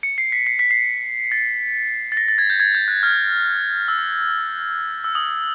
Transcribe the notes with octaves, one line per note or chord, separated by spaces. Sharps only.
C#7
C7
B6
C7
B6
C7
A6
A6
A#6
A6
G#6
G6
G#6
G6
F#6
F6
E6
E6
D#6